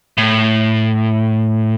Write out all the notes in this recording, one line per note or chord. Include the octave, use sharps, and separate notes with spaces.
A2